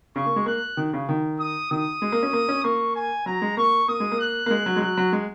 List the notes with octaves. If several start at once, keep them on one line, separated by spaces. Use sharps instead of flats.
C#3 C#6
A#3
G#3
A#3 F#6
D#3
C#3
D#3
D#6
D#3 D#6
G#3
A#3
C#4
A#3
C#4
A#3 C#6
G#5
F#3 A#5
G#3
A#3 C#6
A#3 D#6
G#3
A#3
F#6
A#3
G#3
F#3
G#3
F#3 F#6
F#3
G#3